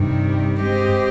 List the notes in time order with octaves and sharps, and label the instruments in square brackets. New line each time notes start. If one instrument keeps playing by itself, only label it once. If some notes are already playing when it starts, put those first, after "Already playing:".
Already playing: [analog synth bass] G2 [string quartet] C3 D#3 G3
[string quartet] G#3 C4 G4 C5 D#5